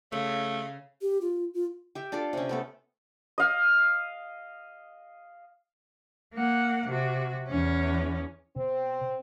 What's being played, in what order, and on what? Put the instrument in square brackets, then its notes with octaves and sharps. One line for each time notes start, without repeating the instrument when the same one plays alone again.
[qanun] C#3 [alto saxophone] A3 [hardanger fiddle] F5
[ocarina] G4
F4
F4
[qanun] G4 E5
D4 F4 A4 D5
C3 C#4
A3 B3 A4
[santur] D#5 F5
[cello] A#3 F#5
C3 F#4
E2 C#4
[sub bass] B2 [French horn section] C4